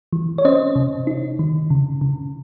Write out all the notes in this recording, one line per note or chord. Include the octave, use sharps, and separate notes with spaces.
E3
C#5
C#4 C5 D#5
C3
D#4
D#3
C#3
C#3